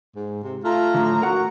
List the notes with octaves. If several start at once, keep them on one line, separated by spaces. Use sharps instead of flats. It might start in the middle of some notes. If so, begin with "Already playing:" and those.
G#2
C3
A3 F4 A#5
A2 D3
F#4 A#4 F#5